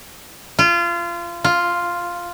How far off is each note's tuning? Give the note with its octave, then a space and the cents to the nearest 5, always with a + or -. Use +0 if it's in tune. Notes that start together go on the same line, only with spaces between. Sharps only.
F4 -25
F4 +0